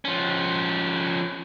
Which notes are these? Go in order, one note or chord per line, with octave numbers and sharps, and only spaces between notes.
F3 C#4